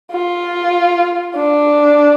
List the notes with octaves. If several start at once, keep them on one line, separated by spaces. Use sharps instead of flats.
F4
D4